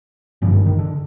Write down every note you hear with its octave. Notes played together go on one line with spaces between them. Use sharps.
G#1 G2 D3 F3
D#3
D#3
D3